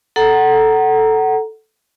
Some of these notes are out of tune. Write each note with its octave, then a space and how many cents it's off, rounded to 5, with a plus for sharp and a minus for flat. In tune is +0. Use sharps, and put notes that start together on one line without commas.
A4 +0 F#5 +20 A#5 +0